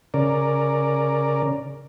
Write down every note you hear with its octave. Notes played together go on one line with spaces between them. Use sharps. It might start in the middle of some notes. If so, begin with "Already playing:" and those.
C#3 A#4 D5